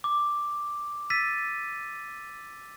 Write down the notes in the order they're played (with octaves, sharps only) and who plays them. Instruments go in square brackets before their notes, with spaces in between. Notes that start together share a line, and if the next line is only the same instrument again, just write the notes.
[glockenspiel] D6
E6 A6 B6 D#7